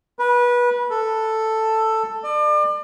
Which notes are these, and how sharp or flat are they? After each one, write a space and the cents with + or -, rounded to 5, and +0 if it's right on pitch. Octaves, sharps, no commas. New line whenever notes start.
B4 -25
A4 +5
D5 +35